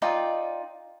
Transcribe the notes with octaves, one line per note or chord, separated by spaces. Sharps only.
D#4 F4 D5 G5